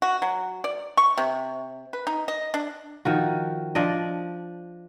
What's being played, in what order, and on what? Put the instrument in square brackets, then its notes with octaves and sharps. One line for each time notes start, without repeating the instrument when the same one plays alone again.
[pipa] F#4
F#3
D5
C#6
C3
B4
D#4
D#5
D4
[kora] D#3 F3 F#4
F3 D4 D5 D#5